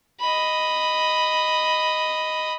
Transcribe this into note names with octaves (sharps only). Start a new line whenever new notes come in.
D#5 B5